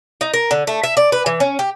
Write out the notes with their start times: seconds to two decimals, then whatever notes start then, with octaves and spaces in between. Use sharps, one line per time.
0.21 D#4
0.34 A#4
0.51 D3
0.67 A3
0.83 E5
0.97 D5
1.12 B4
1.26 E3
1.40 C#4
1.59 G4